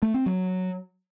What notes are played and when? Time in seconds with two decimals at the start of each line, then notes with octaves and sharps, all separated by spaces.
0.02 A3
0.14 C4
0.26 F#3